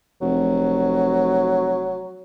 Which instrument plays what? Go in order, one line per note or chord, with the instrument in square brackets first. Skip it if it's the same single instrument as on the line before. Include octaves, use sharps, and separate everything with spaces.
[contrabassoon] F1 [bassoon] F#3